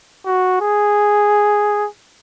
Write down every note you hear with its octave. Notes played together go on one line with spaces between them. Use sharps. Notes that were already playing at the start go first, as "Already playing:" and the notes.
F#4
G#4